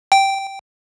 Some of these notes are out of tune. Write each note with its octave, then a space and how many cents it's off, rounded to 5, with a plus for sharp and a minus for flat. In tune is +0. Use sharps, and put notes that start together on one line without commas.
G5 -5